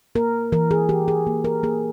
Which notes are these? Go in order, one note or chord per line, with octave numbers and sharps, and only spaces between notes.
A#3 A#4
E3 A#4
G#4
E3 G4
G#4
A#3
A#4
A#3 G#4